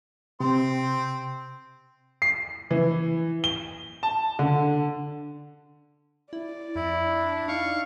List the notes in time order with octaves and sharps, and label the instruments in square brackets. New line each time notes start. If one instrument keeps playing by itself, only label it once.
[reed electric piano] C3 [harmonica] C4 C6
[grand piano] C7
E3
G7
A5
D3
[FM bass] E4 [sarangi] D5
[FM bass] F2 [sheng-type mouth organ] E4
[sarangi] D4
[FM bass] D#4 [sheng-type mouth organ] F5 C#6